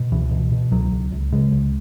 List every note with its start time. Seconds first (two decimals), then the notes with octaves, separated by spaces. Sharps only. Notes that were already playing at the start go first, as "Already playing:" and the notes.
Already playing: B2
0.11 C#2 E3
0.31 B2
0.52 B2
0.71 C#2 F#3
0.92 C#2
1.12 C#2
1.32 C#3 G#3
1.52 C#2